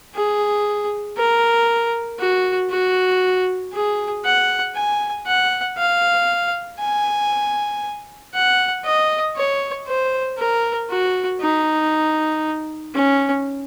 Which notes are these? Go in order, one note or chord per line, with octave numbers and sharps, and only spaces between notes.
G#4
A#4
F#4
F#4
G#4
F#5
G#5
F#5
F5
G#5
F#5
D#5
C#5
C5
A#4
F#4
D#4
C#4